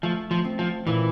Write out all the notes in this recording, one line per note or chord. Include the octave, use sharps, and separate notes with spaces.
F3 A3
F3
C4
F3
A#2 E3